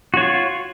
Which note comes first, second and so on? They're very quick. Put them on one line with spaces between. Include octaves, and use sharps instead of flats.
F#4 C#5 F4